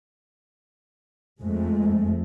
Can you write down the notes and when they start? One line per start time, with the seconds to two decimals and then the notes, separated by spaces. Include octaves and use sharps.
1.41 F2 G#3 A3